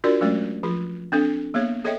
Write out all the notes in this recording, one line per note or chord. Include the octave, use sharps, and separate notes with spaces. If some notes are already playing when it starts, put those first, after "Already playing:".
D4 F4 F#4 A#4 D5
F#3 G#3 A3 C#4 D5
F3 F4 G#4
C4 D4 A4
A#3 B3 G#4 C#5
G#4 A4 C#5 D#5 E5 G5